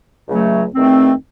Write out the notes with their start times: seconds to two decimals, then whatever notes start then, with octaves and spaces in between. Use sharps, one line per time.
0.27 C#2 C#3 F#3 A3
0.74 E2 D#3 A3 C4